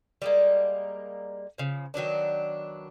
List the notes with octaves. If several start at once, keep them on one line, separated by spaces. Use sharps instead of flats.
G3 G#3 A#3
C#3 F3
D#3 F#3 B3 D4